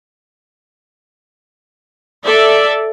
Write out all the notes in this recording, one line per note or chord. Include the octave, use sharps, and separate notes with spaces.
A4 D5 E5